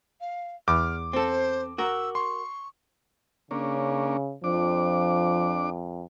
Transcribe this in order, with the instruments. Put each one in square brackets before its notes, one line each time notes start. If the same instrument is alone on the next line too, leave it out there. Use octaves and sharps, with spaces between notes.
[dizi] F5
[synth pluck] E2 [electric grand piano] D6 [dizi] F6
[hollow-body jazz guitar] C4 A4 [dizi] C5
[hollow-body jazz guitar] F#4 A#4 [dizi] E6
[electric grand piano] C6 [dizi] C#6
[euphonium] C#3 [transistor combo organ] A#3 C#4 D4
[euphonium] F2 [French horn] F3 [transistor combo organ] D4 D6